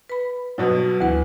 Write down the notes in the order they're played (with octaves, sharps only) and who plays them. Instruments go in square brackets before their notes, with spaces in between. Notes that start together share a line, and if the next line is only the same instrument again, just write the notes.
[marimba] B4 B5
[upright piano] G2 B2 B3 [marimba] F#3
[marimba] D2 B4 [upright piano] E3